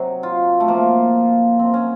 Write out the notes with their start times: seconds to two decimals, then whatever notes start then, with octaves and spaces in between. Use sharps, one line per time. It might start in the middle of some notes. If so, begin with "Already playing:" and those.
Already playing: C3 F#3 D#4
0.23 F4
0.60 A3
0.68 A#2 F3 A#3
1.59 C3 F#3 C4
1.74 C#4